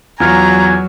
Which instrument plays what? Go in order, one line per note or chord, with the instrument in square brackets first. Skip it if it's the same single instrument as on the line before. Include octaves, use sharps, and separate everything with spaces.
[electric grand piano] E2 F4 F6 [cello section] F#3 [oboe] G#5 [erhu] A#5